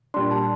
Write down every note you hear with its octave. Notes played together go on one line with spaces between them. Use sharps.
A#2 G3 D4 C6
A5